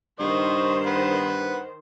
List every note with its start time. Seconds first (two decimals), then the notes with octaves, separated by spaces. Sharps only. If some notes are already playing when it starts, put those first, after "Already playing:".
0.20 G2 D#3 C5 D#5 C#6
0.86 B4 F#5